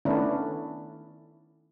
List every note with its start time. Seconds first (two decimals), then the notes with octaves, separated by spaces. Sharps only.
0.05 D#3 A3 B3 C#4 D4 E4